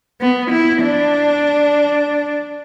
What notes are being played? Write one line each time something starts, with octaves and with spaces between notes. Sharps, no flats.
B3
E4
D4